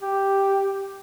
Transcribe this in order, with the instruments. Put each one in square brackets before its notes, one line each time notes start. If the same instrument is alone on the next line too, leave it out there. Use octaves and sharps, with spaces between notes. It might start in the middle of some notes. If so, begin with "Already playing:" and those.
[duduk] G4